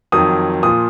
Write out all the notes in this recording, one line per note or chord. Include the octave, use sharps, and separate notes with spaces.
F2 D#3 F#3 D#6
A#2 F3 D#6